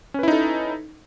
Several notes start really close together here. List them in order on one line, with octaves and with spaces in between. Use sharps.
C#4 B4 E4 D#4 A4